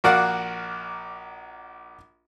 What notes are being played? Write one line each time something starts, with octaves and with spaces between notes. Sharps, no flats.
A#1 F#4 A#4 D5 F5 F#5